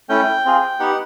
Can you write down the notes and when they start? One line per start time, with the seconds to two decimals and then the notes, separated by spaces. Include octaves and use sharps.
0.09 A3 C#4 E4 G5
0.45 C4 F4 G#4
0.80 B3 D#4 G4 F#5